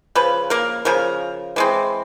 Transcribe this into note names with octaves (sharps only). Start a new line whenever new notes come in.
C#3 F3 B4
A#3 A#4
C#3 F3 A#4
E3 G#3 C4